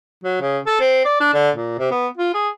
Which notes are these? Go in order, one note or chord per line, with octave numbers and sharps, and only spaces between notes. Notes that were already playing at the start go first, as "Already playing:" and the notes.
F#3
C#3
A4
C4
D5
D4
D3
A#2
C3
B3
F4
G#4